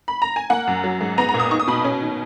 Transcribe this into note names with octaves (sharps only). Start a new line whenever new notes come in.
B5
A#5
G#5
A#3 F#5
F#2
F#3
G#2
B3 A#5
A#5
A#2
D#6
D#4 C#6
D#6
B2 B5
C#4
D#3